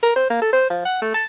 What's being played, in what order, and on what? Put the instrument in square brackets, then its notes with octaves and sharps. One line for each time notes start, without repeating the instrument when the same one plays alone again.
[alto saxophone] A#4
C5
A#3
A4
C5
F3
F#5
A3
A5